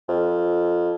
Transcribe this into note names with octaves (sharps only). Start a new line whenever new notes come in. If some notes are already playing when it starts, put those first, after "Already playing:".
F2